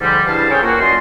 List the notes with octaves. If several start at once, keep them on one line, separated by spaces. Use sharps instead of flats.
G#2 D3 F3 G3
G2 C#3 E4 C5 F5 A5
C#4 G#4 A4 C5 C#5 G5
A#3 F4 F#4
F#2 D5 D#5 C6